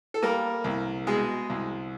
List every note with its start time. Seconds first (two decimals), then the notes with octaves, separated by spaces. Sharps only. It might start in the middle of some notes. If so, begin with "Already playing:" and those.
0.14 A4
0.22 G3 A#3 A#4
0.64 C2
1.07 B2 G#3 G#4
1.50 C2